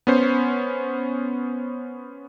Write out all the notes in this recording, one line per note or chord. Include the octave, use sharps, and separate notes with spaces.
B3 C#4 C5